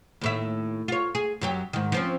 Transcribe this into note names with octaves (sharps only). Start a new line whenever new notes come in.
D#2 A2 E5
F4 C#5
G#4
F#2 F#3 G4
G#2 D#3
F3 C4 C#4